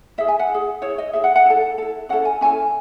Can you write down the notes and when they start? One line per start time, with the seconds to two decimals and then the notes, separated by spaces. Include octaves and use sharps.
0.18 E4 G#4 E5
0.28 G#5
0.39 F#5
0.50 E4 G#4
0.82 E4 G#4 C#5
0.98 D#5
1.13 E4 G#4 E5
1.24 F#5
1.36 F#5
1.46 E4 A4
1.78 E4 A4
2.09 C#4 E4 A4 F#5
2.25 G#5
2.41 C#4 E4 A4 G#5